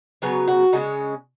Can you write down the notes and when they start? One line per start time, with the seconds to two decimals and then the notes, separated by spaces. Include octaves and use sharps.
0.22 C#3 F#3 B3 C#5
0.48 F#4
0.73 C#3 G#3 C#4 D#4